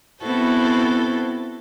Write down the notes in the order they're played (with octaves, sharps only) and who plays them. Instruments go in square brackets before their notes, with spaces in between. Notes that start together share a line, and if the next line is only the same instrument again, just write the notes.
[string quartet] B3 C4 E4 F#4 A4 C5